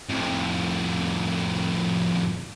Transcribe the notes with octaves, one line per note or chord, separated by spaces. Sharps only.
F2 A2